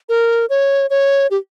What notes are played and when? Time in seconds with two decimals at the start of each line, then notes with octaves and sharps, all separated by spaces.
0.09 A#4
0.50 C#5
0.90 C#5
1.31 G4